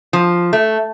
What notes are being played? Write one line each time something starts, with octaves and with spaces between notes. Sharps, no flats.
F3
A3